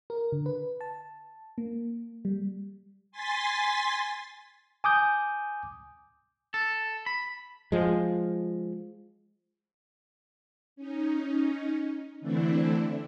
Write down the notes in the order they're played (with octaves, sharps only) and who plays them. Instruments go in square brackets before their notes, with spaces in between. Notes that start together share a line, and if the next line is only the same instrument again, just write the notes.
[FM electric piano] A#4
D3
B4
A5
A#3
G3
[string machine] G#5 C6 A6 B6
[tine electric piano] G#5 D6 D#6 G6
[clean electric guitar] A4
B5
[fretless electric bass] F3 G#3
[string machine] C#4 D#4
D3 E3 A3 C4 D4 E4